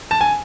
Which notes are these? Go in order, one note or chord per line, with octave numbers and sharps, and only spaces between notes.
A5
G#5